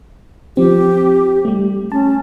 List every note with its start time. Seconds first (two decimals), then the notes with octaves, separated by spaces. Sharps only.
0.57 F3 C4 G4
1.45 G3 A3
1.92 C#4 A5